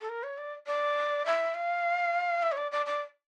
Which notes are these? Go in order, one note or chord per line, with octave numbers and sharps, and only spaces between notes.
A4
A#4
C#5
D5
D5
E5
F5
E5
C#5
D5
D5
D5